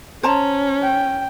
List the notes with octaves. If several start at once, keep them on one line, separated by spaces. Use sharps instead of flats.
C#4 C5 A5 A#5
G5